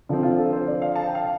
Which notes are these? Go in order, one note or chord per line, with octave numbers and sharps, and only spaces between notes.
D3 F3 C4
F4
A4
C5
D5
F5
A5
G5
F5